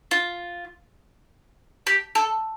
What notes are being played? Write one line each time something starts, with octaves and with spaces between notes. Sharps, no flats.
F4
G4
A4